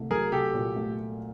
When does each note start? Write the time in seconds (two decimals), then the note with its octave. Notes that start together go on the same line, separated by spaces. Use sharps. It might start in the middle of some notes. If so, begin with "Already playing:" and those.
Already playing: C2 A3
0.10 F#3 G#4 A#4
0.32 C2 G4 A4
0.54 A#2
0.76 A3